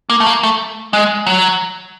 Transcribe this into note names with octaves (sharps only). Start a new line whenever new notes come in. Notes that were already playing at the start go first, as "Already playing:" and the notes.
A#3
A3
A#3
A3
G#3
F#3